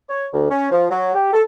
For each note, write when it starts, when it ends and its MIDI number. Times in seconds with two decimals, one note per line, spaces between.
0.09 0.27 73
0.33 0.45 38
0.49 0.67 61
0.71 0.87 53
0.90 1.11 54
1.14 1.30 67
1.33 1.41 69